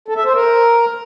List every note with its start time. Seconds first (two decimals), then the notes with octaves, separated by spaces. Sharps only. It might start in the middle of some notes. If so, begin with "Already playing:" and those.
0.08 A4
0.17 E5
0.25 C5
0.33 A#4